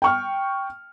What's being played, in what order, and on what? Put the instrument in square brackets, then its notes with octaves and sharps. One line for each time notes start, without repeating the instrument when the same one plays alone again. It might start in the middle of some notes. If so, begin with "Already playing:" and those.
[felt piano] G5 C#6 F6